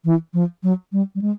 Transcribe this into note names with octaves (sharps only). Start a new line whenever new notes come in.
E3
F3
F#3
G3
G3
G#3